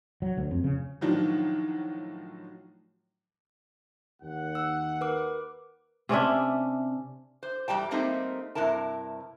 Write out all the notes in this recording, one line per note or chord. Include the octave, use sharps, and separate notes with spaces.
F#3
D2
F2
C#3
A2 D#3 F3 F#3 D4
D#2 F#5
E6
A#4 B4 D6
C3 C#4 D4 E5
C5
E2 G2 G3 G5 A5
G3 A3 A#3 C4 D#4
G2 C3 E4 A#4 A5